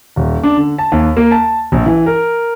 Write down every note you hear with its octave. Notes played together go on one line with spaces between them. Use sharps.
D#1
D4
D3
A5
D#2
A#3
A5
A#1
E3
A#4